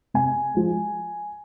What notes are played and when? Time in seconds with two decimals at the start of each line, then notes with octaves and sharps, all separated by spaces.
0.14 C3 G#5
0.54 F3 G#3